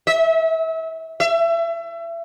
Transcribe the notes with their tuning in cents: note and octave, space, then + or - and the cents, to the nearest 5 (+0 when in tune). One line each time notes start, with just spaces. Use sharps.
E5 -30
E5 +30